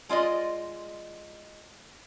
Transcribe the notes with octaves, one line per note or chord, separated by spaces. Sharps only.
G#3 F4 D5 D#5